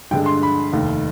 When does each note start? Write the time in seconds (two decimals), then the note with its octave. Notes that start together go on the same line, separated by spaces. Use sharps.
0.11 G2 D3 G#3 G5
0.26 C6
0.43 B5
0.73 F1 D#2 D#3